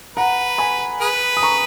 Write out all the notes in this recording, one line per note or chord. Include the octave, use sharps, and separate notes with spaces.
B4 F#5 A#5
G#5 B5
G#4 B4
D#6
A#5 C#6